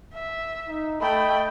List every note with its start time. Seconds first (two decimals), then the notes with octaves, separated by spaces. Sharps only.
0.14 E5
0.67 D#4
1.01 A3 D#5 G5 B5